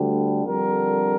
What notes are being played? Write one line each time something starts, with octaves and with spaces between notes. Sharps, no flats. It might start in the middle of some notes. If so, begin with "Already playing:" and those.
Already playing: D2 D3 G3
F2 D3 G3 A#4